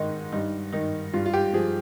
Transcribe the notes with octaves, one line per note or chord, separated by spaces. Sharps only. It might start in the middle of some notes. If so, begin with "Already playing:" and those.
Already playing: G#2 D#3 D#4
G2 D#4
D#3 D#4
G2 F4
F4
G4
F3 G#4